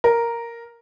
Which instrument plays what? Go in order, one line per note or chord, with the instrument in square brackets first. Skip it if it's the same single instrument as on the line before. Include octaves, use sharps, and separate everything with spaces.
[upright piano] A#4